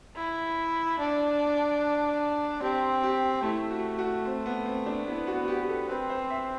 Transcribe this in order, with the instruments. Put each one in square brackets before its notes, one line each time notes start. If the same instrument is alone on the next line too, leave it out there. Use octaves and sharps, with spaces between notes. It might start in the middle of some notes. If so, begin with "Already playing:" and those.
[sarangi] E4
D4
[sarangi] C4 [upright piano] G4
[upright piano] G4
[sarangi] A3 [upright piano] E4
[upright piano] F#4
F#4
C4
B3
C4
D4
[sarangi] B3 [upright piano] E4
[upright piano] F#4
F#4
G4
G4
A4
[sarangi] C4 [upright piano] B4
[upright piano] C5
E5